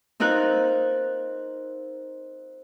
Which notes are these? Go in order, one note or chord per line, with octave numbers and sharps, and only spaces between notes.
C4 D#4 F4 A#4 F#6